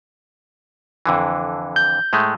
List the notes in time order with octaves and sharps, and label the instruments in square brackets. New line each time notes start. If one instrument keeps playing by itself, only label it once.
[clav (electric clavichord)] F2 D3 E3
[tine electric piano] G6
[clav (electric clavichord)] A2 G#3 A3